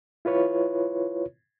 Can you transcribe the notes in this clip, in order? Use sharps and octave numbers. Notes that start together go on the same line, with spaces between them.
E4 F4 B4 C#5